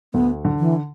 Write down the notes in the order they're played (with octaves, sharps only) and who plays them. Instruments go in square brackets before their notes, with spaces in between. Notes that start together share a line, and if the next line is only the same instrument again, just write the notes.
[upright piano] D2 [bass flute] B3
[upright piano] D3
[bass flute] E3